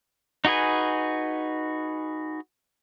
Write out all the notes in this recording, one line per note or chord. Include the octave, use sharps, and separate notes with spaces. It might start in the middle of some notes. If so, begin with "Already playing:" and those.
D#4 F#4 G#4 B4 G#5